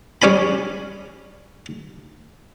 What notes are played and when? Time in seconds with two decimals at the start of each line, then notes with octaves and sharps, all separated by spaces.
0.22 G3 C#4 G#5 B5